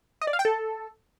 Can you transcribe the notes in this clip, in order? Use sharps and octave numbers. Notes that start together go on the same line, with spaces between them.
D#5
D5
F5
G5
A4